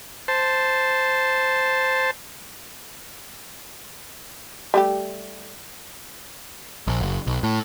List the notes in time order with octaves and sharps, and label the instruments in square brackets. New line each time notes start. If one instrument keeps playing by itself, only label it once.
[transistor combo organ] C5 A5
[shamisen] G3 A3 G4
[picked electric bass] A#1
F#1
B1
A2